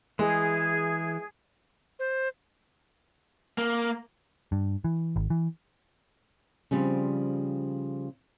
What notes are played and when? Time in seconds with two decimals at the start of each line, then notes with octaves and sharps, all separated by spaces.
0.19 E3 G#3 G#4
1.99 C5
3.58 A#3
4.52 G2
4.84 E3
5.16 G#1
5.30 E3
6.71 C#3 F3 G3 C4